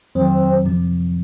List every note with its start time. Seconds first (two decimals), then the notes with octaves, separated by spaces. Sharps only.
0.15 F2 D#3 F#3 C4
0.65 F2 C3 F3 C4